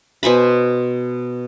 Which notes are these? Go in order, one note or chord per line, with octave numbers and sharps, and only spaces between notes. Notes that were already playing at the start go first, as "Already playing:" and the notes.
B2 C5 G#5 B5